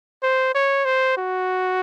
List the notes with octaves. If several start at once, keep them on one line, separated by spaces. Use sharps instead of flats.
C5
C#5
C5
F#4